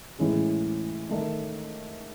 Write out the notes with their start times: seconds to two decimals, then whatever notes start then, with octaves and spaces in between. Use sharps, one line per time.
0.19 A2 E3 G#3 C#4 G#4
1.09 D#3 A3 D#4